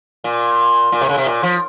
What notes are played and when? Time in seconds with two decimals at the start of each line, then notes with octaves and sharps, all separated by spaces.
0.24 A#2
0.92 A#2
1.01 C3
1.09 C#3
1.18 C3
1.26 A#2
1.43 F3